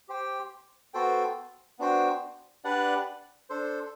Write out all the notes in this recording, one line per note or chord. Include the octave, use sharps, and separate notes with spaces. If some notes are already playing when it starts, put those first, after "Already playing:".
G4 C5 G5
B3 F#4 A4 C5 G5
B3 D4 F#4 C5 G5
D4 G4 B4 D5 F#5
D4 A4 C5